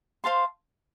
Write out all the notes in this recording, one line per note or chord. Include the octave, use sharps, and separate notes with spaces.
C5 F5 A5 C6